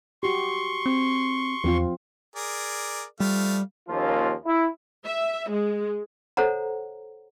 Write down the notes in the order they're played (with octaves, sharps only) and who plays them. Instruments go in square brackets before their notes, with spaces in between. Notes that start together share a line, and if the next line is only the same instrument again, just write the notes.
[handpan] F#4 G4 [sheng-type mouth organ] C6 C#6
[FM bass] C4
[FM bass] E2 [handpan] F3 C4 F4
[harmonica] G#4 A#4 D5
[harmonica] F3 A3 F5 [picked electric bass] G3
[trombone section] D#2 F3 A#3 C#4 F4
E4
[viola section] E5
G#3
[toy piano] A4 C5 C#5 F#5 A#5